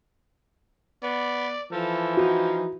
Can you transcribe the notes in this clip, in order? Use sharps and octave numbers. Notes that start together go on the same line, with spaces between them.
B3 D5
E3 F3 A4
D#4 F#4